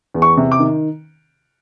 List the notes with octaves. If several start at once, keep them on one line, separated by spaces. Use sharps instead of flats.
E2
C#6
C3
D6
D#3